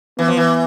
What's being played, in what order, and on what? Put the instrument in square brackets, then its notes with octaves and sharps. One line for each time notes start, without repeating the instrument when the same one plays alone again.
[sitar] E3 [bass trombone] B3
[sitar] F3
E3